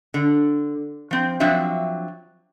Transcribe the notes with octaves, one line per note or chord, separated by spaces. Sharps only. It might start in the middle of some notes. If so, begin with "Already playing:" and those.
D3
F3 C4
F3 F#3 C4 D4 E5 F5